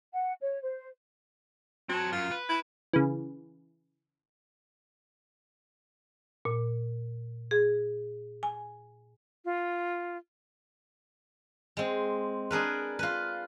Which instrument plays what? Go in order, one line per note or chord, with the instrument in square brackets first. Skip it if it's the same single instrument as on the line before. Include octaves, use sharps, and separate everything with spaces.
[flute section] F#5
C#5
C5
[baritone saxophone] F#3 [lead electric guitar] C4 A5
[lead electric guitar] F#2 [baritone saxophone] F4
[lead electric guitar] B4
[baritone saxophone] E4
[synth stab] C#3 E3
[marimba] A#2
G#4
G#5
[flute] F4
[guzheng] G#3 C4
D4 G#4 A#4 B4
F4 B4